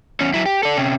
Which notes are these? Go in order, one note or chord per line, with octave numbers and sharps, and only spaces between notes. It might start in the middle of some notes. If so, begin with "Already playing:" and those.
E2 C#4
F#3 E4
G4
A4 D5
C3 C#4